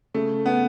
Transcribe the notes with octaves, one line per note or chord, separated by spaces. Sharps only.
C#3 A3
B3